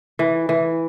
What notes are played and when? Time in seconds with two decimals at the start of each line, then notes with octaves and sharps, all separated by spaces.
0.19 E3
0.49 E3